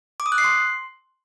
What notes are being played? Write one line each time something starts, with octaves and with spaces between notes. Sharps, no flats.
D6
D#6
F#6
C7
C6